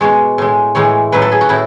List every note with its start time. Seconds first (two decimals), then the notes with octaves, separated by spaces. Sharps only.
0.01 B2 G#3 C#5
0.38 A2 G#3
0.75 A2 E3 G#3 C#5
1.12 A2 F#3 B4
1.22 A4
1.32 G#4
1.41 F#4
1.49 A2 E4